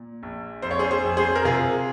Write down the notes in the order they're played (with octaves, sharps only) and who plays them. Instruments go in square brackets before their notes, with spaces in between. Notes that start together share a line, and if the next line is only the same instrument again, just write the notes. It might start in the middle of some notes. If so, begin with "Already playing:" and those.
Already playing: [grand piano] A#2
A#1
F2 C5
C#5
G#4 C5
G#4 C5
F2
G#4 C5
A#4
C3 F4 G#4